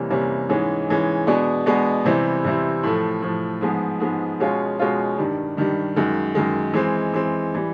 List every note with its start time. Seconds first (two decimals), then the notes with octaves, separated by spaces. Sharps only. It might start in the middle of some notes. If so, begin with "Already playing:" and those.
Already playing: C3 E3 G3 A#3 C#4
0.10 C3 E3 G3 A#3 C#4
0.49 G#2 E3 G#3 C#4
0.88 G#2 E3 G#3 C#4
1.27 B2 G#3 B3 D4
1.66 B2 G#3 B3 D4
2.05 C3 E3 G3 C4 E4
2.44 C3 E3 G3 C4 E4
2.83 A2 F3 A3
3.22 A2 F3 A3
3.61 G#2 F3 G#3 B3
4.00 G#2 F3 G#3 B3
4.40 B2 G#3 C#4 F4
4.79 B2 G#3 C#4 F4
5.18 G2 D#3 G3
5.57 G2 D#3 G3
5.96 F#2 D#3 G#3
6.35 F#2 D#3 G#3
6.73 E3 G#3 C4
7.13 E3 G#3 C4
7.55 E3 G3